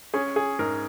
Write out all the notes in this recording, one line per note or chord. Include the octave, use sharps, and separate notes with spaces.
C#4 G#4
G#4
G#2 A#4